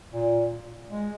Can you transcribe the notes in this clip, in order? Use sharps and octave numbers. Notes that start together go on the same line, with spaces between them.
A#2
G#3